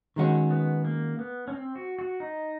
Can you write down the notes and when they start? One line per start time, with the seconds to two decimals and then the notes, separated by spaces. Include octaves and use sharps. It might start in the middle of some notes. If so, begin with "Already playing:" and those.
0.16 D#3 G#3 C#4 F#4
0.51 B3
0.85 A#3
1.19 B3
1.48 C#4
1.52 C4
1.76 F#4
1.99 F#4
2.20 D#4